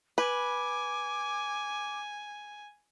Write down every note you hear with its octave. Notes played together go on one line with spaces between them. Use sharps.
B4 G#5 D6